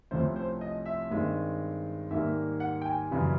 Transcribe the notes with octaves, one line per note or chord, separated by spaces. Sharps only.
C2 C3 F3 A3 C#4 C5
C5
D#5
E5
G2 D#3 G#3 C4
G#2 D#3 G3 A#3 E5
F#5
G5
G#5
F#2 C#3 E3 G3